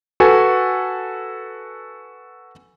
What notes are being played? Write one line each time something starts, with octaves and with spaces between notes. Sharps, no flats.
F#4 A4 B4 G#5